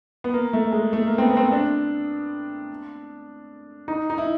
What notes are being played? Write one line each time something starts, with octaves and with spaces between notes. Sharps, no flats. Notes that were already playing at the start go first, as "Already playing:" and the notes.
B3
A#3
A3
G#3
A3
A#3
C4
B3
C4
D4
D#4
D#4
E4